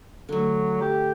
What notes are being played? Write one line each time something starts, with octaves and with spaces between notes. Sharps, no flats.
D3 F#3 A3
G4